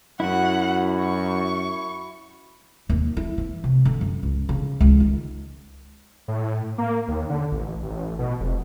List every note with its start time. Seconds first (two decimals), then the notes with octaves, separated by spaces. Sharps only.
0.20 F#2 E4 F#4 F#5
1.01 C#6
2.89 D#2
3.17 E4
3.38 E3
3.64 C3
3.85 D3
4.01 F#2
4.23 C#2
4.49 C#3
4.80 C#2
5.00 D#3
6.28 A2
6.78 A#3
7.08 D#2
7.30 D3
7.52 A1
7.83 A1
8.19 B2
8.41 F1